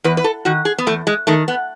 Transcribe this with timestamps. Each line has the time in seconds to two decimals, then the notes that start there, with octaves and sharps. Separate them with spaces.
0.04 E2 B4
0.17 B4
0.24 A4
0.45 D#3 F#4
0.65 G#4
0.78 B3
0.87 E2 A3
1.07 G#3
1.27 D#3 A3
1.48 B3